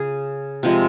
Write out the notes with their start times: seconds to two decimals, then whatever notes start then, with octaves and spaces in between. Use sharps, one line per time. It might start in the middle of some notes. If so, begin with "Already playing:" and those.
Already playing: C#3 G#4
0.63 C3 F3 G#3